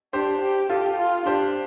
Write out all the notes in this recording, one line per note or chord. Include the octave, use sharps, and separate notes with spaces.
D4 G4 C5
G4
F4 G4 A4
F4
D4 G4 C5